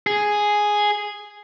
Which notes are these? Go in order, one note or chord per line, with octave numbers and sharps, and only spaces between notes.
G#4